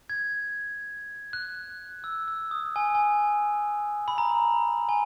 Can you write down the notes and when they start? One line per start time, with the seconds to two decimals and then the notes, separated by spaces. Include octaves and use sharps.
0.10 G#6
1.33 F#6
2.04 E6
2.28 E6
2.51 D#6
2.76 G#5
2.95 G#5
4.08 B5
4.18 A#5
4.89 G#5